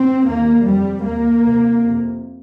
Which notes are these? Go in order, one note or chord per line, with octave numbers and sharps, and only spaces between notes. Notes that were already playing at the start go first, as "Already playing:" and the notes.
Already playing: C4
D#2 A#3
F2 C3 G3
D#2 A#3
C2 C3
F2 C3